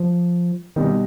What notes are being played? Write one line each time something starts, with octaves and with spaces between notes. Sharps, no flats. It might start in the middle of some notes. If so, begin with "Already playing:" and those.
Already playing: F3
B2 D#3 G3 B3 D#4